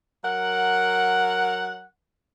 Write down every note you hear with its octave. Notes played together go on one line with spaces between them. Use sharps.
F#3 A#4 F#5